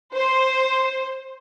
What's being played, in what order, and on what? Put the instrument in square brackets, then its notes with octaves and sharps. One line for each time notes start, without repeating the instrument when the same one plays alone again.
[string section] C5